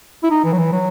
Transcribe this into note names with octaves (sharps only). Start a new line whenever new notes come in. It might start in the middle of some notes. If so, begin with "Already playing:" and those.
E4
D#4
E3
F#3
E3
F#3